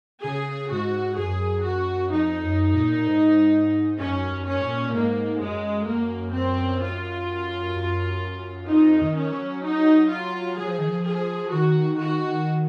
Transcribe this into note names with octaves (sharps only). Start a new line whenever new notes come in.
C#3 G#4
G#2 F#4
F#2 G#4
F#4
F2 D#4
F#2
A#2
A#2
G#2
F#2 C#4
F#2
C#4
G#2
A#2
A#2
G#2 A#3
F#2 G#3
F#2 A#3
C4
F4
F#2
F2 D#4
D#3
C#4
F#3
D#4
F4
F#3 G#4
F3
D#3
F3
G#4
D#3 F#4
F#4